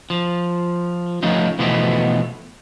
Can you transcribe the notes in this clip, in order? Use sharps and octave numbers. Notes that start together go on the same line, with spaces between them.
F3
F3 A3 B3 C#4 D#4
B2 E3 F3 A3 B3